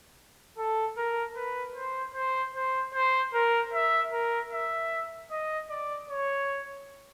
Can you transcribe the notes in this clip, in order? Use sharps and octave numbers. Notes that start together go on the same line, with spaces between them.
A4
A#4
B4
C5
C5
C5
C5
A#4
E5
A#4
E5
D#5
D5
C#5